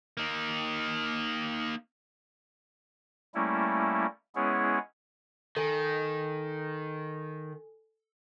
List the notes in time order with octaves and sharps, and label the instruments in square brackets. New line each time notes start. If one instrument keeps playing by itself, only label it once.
[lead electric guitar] A#3 D#4
[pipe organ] G3 A3 A#3 C#4 E4
G#3 B3 C#4 E4 G#4 C#5
[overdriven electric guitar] D#3 [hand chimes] A4 G#5